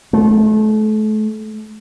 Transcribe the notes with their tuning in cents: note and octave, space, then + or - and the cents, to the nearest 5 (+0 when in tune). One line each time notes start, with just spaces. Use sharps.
A3 -35